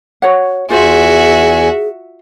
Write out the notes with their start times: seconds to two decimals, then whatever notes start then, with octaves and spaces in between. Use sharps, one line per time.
0.22 F#4 C#5 F#5
0.70 E2 F4 F#4 G#4 C5 E5 G#5